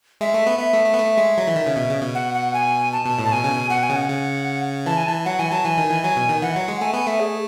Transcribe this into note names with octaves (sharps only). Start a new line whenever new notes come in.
G#3 E5
A3
B3
B3 E5
A3
A3
B3
A3
G#3
F#3
E3
D#3
C#3
B2
C#3
B2
F#5
F#5
G#5
A5
B2
A2
A5
B2 G#5
C#3
B2
B2 F#5
G#5
C#3
F#5
C#3
E3 A5
G#5
E3 A5
F#3 F#5
E3 G#5
F#3 A5
E3 G#5
D#3
E3
F#3 G#5
B2
D#3
E3 F#5
F#3
G#3
A3 G#5
B3 G#5
A3 E5
G#4